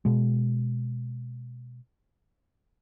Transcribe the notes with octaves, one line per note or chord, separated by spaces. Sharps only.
B2 G#3